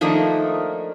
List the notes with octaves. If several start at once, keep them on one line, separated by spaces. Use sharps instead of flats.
D#3 F3 A3 A#3 D4 D#4